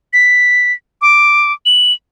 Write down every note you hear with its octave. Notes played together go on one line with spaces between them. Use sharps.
B6
D6
F#7